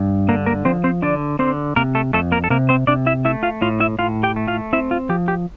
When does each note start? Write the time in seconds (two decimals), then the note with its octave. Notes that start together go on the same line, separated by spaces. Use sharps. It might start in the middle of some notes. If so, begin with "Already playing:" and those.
Already playing: G2
0.29 D3 A#3 A#4
0.46 A#3 A#4
0.65 F3 C4 C5
0.84 C4 C5
1.02 D3 D4 D5
1.39 D3 C4 C5
1.76 C3 A#3 A#4
1.95 A3 A4
2.13 F2 A3 A4
2.32 A#3 A#4
2.44 A4
2.50 C3 A#3 A#4
2.69 C4 C5
2.87 C3 D4 D5
3.06 E4 E5
3.25 A3 E4 E5
3.43 F4 F5
3.62 A2 F4 F5
3.80 E4 E5
3.98 A2 F4 F5
4.23 G4 G5
4.36 A3
4.48 F4 F5
4.73 C4 E4 E5
4.91 F4
5.09 F3 G4
5.28 G4